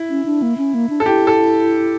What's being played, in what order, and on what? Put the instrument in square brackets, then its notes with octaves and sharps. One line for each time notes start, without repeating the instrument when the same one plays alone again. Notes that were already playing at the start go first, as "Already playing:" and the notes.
Already playing: [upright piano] E4
[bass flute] C#4
D4
A#3
C#4
A#3
D4
[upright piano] A4
[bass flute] E4 [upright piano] G4
[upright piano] A4